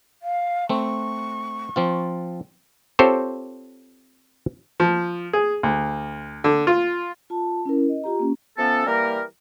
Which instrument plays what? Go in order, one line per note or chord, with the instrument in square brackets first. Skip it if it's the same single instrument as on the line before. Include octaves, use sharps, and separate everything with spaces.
[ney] F5
[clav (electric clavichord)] A3 C4 [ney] C#6
[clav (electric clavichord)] F3 C4 F4
C4 F4 G4 A4 C5 C#5
[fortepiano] F3
G#4
D2
D3
F4
[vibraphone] F4 A5
C#4 E4 A#4
D#5
F4 G4 A#5
A#3 C#4
[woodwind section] F3 A3 B3 C#4 A4
E3 G3 A#3 A#4